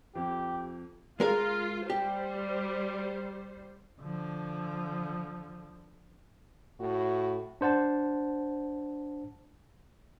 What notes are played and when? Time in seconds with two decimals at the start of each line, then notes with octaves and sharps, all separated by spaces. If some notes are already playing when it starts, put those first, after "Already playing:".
0.15 F2 G4
1.20 G#3 F4 A#4 F5
1.90 G3 G4 C5
4.02 D3 F3
6.80 A2 F#4
7.61 D4 C5 F#5 A5